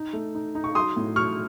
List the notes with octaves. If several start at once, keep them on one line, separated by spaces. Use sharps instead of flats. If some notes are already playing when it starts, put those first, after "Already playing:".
Already playing: D#4
A3
D#4
D#4
C#6
F#3 C6 D#6
A2
F#3 C#6 F6